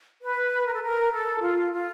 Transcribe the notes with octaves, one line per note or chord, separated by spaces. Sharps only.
B4
A#4
A4
A#4
A4
F4
F4